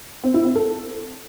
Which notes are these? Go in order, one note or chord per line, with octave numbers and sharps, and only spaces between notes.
C4
E4
C4
A4